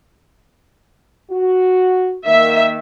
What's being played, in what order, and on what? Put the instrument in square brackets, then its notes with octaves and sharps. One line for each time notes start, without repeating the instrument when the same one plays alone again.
[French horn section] F#4
[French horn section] D#3 A#3 [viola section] E5